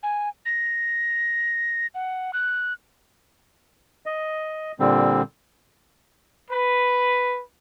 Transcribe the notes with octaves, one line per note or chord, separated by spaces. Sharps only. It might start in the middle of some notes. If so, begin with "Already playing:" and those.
G#5
A#6
F#5
F#6
D#5
A#2 D3 G3 C4
B4